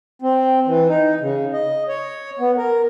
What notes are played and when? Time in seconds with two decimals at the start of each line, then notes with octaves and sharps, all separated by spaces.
0.22 C4
0.67 E3
0.88 D#4
1.21 C#3
1.53 D#5
1.89 C#5
2.39 B3
2.57 A#4